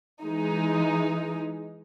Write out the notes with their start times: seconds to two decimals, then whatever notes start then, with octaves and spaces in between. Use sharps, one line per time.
0.23 E3 G#3 D#4